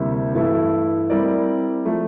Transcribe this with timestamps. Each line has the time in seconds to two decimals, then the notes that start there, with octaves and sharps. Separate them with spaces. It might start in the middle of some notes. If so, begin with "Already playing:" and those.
Already playing: D2 C3 G3 A#3 E4
0.34 G2 E3 A3 E4 A4
1.10 G3 C4 E4 A#4 D5
1.85 F3 A3